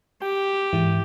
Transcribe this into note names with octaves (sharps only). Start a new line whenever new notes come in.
G4 G5
G#2 E3